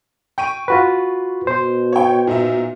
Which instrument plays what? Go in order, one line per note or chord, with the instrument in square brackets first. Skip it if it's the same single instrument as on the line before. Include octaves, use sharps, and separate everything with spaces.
[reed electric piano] G5 [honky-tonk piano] C#6 D7 D#7
[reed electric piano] F4 F#4 B4
[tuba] B2 [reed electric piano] C5
[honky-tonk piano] C#5 G5
A#2 D#4 E5